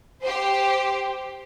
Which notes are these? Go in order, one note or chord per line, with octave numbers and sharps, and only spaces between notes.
G4 C5